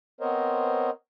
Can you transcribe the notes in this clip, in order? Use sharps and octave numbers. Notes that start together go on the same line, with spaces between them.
B3 C4 A#4 C5 C#5 D#5